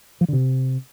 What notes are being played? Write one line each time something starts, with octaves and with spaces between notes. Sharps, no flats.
F3
D3
C3